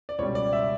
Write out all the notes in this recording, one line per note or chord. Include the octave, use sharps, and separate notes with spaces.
D5
C#2 B2 G3 C#5
D5
E5